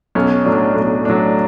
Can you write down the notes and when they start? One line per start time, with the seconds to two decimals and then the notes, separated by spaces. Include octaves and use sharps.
0.15 B1 C#4
0.45 A2 F#3 D4
0.75 B1
1.05 A2 F#3 D4